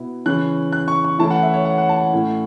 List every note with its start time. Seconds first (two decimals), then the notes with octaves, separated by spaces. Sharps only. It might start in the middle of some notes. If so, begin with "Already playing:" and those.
Already playing: B2 B3 E4
0.26 C#3 E3 C#4 F#6
0.72 F#6
0.88 C#6
1.04 C#6
1.19 E3 A3 C#4 E4 A5
1.31 F#5
1.43 E5
1.54 C#5
1.65 F#5
1.78 F#5
1.89 A5
2.01 F#5
2.13 A2 A3 C#4 E4